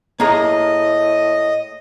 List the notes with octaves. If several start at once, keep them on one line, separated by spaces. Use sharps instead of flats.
A2 A#3 G#4 D#5 A#5